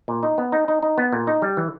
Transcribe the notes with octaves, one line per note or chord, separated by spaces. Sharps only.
A#2
D#4
B3
D#4
D#4
D#4
B3
A#2
D#4
G3
E3